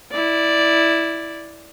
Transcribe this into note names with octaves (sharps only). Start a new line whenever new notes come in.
E4 D5